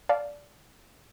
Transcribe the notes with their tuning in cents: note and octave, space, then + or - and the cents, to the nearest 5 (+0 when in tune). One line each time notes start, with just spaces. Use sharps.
D5 -10 F5 +0 A5 -25